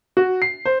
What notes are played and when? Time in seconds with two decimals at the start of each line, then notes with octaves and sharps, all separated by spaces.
0.17 F#4
0.42 C7
0.65 C5